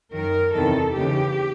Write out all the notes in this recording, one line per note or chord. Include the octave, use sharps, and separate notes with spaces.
F#2 D#3 A#4
E2 C3 D#3 A4
D#2 C#3 E3 G4